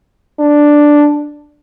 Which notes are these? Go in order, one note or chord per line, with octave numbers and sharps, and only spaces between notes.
D4